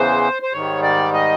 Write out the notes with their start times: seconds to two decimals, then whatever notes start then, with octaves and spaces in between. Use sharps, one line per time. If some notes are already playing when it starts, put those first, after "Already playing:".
Already playing: E2 C#3 E3 C5
0.42 C5
0.53 G#2 D#3 G3 C#5
0.83 D5
1.13 D#5